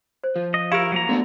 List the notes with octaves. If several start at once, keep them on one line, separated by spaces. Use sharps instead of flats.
C5
F3
D#5
E4 G4 A#4 F5 E6 G#6
F#3 A#3 A#5
A3 B3 D4 F#4